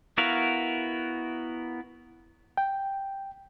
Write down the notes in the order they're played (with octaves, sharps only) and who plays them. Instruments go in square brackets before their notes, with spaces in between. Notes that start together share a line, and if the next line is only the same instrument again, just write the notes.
[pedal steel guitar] B3 E4 F#4 A#4 F5
[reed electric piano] G5